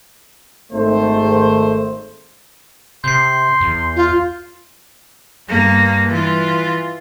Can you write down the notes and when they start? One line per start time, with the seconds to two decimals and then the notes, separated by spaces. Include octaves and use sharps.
0.72 G#1 A3 C5
3.04 C3 C6 G6 C7
3.61 E2
3.96 F4
5.48 G2 A#3
6.08 E3 F4